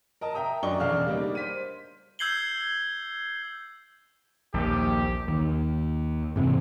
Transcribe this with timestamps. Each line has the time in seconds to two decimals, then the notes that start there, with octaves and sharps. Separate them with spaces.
0.21 A#4 D#5 A5
0.34 E5 G5 A#5 D#6
0.63 F#2 D4 D#5 C#6 G7
0.80 E1 E2 C#3 D4 F5 F6
1.07 G3 A#3 D4 D#4
1.35 C5 B6 D#7
2.19 E6 G6 G#6 C7 F#7 G7
4.54 A#1 D#2 G4
5.28 D#2
6.36 G#2 C3 E3